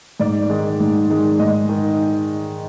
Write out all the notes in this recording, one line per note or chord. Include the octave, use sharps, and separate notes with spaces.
G#2 D5
D#3 G#3
G#2
D#3 G#3
G#2 D#5
D#3